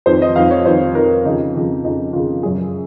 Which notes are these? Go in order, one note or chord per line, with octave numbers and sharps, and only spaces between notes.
F2 D#3 C5
D#5
F2 D#3 F5
C#5
F2 D#3 C5
F2 D#3 A#4
F2 C#3 D#4
F2 C#3
F2 C#3 D#4
F2 C#3 F4
F#2 C#3 G#4